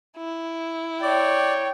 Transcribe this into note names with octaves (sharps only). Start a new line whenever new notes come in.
E4
C#5 D5 G5